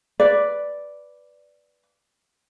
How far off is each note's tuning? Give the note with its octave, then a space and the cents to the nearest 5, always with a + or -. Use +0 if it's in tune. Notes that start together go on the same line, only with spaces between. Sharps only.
B4 +0 D5 +0